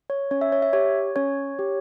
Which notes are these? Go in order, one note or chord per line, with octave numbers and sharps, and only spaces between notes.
C#5
C#4 C#5
E5
C#5
E5
G4 C#5
C#4 C#5
G4